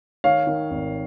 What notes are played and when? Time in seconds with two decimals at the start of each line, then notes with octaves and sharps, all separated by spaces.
0.24 D#3 C#5 F5
0.47 D#3
0.71 G#1